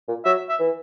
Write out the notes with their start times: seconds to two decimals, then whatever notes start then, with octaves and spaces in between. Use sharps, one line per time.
0.08 A#2
0.25 F#3 E5
0.49 E5
0.60 E3